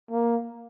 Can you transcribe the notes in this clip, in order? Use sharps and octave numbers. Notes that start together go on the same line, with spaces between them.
A#3